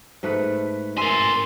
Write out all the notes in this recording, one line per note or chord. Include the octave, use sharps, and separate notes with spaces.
G#2 A3 B4
A#4 E5 G#5 C6